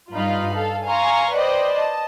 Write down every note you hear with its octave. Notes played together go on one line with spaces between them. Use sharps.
G2 D#4 F4 F5 B5
A4 F5
F5 G#5 A#5 C6 C#6
B4 C5 D5 D#5 G5
D#5 A5